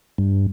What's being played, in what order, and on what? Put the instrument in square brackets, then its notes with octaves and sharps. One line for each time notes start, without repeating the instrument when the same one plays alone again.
[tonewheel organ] G2